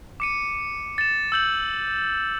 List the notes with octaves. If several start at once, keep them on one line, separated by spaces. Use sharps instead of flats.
D6 C#7 D#7
A6 E7
E6 G6 F#7